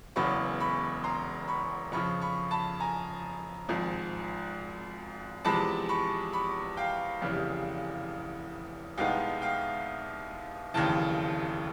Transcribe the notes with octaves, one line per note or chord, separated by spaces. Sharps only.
E1 E2 C#3 F#3 B3 B5 C#6
B5 C#6
A#5 C6
B5 C#6
F2 C#3 F3 B5 C#6
B5 C#6
A5 B5
G#5 A#5
G#1 G#2 F3
E2 C3 F3 G#3 A5 B5
B5 C#6
B5 C#6
F5 G5
F1 E2 C#3 E3 G3
C2 B2 G#3 B3 D#4 F5 G5
F5 G5
F1 D#2 C#3 E3 G5 A5